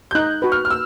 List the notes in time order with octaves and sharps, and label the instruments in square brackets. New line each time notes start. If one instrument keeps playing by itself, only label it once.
[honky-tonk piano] G6
[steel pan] D#4 [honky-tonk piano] F#6
[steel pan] F#4 B4
[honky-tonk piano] F6
F6
E6